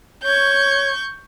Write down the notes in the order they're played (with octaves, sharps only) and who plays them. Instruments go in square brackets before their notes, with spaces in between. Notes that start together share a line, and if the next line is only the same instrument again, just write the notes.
[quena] C#5 [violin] C#6 G6